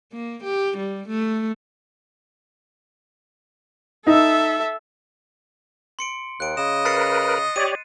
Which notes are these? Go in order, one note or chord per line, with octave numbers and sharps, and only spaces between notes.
A#3
G4
G3
A3
D#4 A4 E5
C6 C#7 D7
D#2 F#6 D7
C#3 D#5 E7
A#4 B4 A6 C7 C#7
G4 C#5 D5 D#7